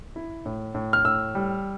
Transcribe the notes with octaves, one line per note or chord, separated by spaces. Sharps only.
E4
A2
A2
F6
A2 E6
G3